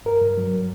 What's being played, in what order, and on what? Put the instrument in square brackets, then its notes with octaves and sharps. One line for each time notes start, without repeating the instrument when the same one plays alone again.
[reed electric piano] G2 A#4
G2
F#3